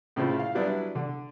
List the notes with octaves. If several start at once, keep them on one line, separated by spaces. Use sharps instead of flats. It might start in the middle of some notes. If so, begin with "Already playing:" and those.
A2 C#3 C4 E4 F4
F5
F#3 G3 B3 D4 E4
D3